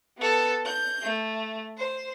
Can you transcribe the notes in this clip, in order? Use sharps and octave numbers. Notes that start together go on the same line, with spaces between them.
B3 A4
G6
A3
C5